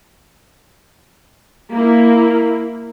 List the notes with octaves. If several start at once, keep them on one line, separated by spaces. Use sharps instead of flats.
A#3 E4